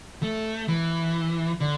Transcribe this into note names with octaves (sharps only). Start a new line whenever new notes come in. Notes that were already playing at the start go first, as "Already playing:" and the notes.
A3
E3
D3